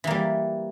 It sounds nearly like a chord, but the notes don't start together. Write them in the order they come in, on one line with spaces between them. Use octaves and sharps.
E3 A#3 G3